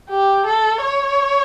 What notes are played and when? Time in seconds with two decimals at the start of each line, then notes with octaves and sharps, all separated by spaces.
0.10 G4
0.46 A4
0.82 C#5